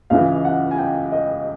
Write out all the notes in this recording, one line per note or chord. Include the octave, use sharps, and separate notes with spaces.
C#2 C#3 E3 F5
F#5
G#5
G5
D#5